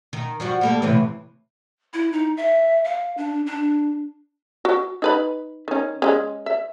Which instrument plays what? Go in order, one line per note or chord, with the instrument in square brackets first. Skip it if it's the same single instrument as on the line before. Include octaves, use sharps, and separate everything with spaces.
[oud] D#3
F3 G3 F#4
G3 A#3 A4
A2 C3 E3
[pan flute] E4
D#4
E5
F5
D4
D4
[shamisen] F#4
D#4 B4 B5
D#3 C#4
G#3 C#4
E5